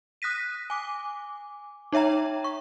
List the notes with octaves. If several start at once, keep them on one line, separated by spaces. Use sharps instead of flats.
D#6 F#6 A#6 B6 D#7
G#5 D6
D#4 C#5 E5 G5 A#5
C#6